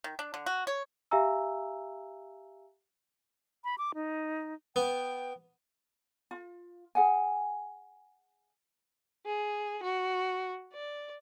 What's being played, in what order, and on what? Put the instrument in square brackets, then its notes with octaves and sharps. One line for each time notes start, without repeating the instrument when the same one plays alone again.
[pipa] D#3
D4
D3
F#4
C#5
[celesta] G4 E5 F5 G#5 A#5 E6
[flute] B5
D6
D#4
[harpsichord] B3 [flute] G5
[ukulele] F4
G#4 F#5 G#5
[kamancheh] G#4
F#4
D5